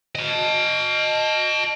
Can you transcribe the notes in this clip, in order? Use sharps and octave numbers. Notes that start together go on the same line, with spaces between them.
D#5 A5